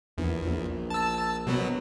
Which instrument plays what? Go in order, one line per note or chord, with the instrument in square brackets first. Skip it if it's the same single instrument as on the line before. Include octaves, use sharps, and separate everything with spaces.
[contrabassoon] A#1 [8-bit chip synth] E2
[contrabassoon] A#1
[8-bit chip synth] A5 E6
B2 F#3 B3